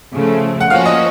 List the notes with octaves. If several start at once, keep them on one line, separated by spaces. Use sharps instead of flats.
C#3 F3 A3
F#5
F3 A#3 C#4 F#4 F5
D#5